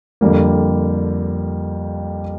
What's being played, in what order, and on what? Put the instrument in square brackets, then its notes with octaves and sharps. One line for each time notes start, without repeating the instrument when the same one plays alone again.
[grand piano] F2 D3 G3 A#3